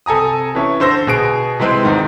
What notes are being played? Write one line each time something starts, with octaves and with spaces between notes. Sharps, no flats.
C3 A4 G#5 A#5 D#6
E3 C#4 E5
D3 C5 E6 A#6
B2 G#4 D7
C3 E3 G#3 C4
E2 G#2 D#3